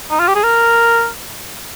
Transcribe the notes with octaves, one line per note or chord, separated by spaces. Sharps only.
D#4
F4
G4
G#4
A#4